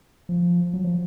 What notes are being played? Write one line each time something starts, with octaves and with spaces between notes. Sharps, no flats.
F3
F#3
F3